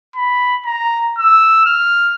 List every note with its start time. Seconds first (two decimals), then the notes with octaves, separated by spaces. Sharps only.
0.16 B5
0.66 A#5
1.18 E6
1.66 F6